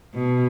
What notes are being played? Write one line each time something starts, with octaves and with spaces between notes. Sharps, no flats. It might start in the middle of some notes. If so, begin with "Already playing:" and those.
B2